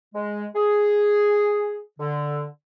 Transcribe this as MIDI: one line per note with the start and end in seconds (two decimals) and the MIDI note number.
0.15 0.44 56
0.55 1.81 68
1.99 2.46 50